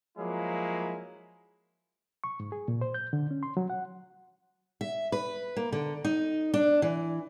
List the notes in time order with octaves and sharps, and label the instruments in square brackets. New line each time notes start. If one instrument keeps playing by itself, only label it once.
[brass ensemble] F3 F#3 G#3 A#3 E4
[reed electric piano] C#6
G#2
G#4
A#2
C5
G6
D3
C#4
C6
F#3
F#5
[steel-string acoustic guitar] E5
B4
A#3
D3
D#4
D4
E3